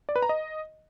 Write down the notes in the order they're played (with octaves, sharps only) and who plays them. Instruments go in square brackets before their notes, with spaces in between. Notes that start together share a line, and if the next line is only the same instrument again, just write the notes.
[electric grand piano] D5
B4
A#5
D#5